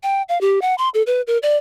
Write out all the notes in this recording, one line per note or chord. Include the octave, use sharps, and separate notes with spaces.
G5
F5
G4
F#5
C6
A4
B4
A#4
D5